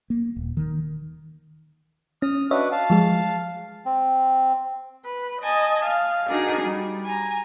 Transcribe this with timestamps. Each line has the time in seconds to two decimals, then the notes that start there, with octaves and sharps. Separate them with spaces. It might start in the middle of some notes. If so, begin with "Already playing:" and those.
0.10 A#3
0.36 D#1
0.57 D#3
2.22 C#4 D#6 F6
2.51 D4 F#4 B4 C#5 D#5 E5
2.72 F5 A5
2.90 F3 G#3 G#4
3.86 C4
5.04 B4
5.41 D#5 G#5 A5
5.85 F5
6.28 D4 D#4 F#4 G#4 A#4
6.61 G3
7.05 G#5 A#5